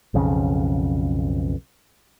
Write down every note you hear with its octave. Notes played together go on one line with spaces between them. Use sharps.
B1 F2 C#3